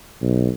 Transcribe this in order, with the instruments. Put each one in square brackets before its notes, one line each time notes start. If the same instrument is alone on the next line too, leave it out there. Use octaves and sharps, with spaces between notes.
[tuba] B1